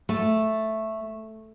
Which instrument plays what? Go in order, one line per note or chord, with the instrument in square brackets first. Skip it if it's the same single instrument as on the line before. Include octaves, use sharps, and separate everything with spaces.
[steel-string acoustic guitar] A3